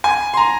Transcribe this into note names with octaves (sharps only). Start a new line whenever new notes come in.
G#5
C6
A#5